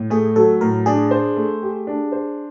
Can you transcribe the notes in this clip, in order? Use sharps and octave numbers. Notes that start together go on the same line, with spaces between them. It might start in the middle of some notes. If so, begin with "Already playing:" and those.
Already playing: A2
A3 G#4
F#3 A4
A2 A#4
D4 G#4
C5
A3
G4
D4
C5